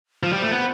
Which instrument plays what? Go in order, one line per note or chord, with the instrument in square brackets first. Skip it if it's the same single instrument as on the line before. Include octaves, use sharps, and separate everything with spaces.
[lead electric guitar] F3
[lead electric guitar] G3 [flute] C5
[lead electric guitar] A3
B3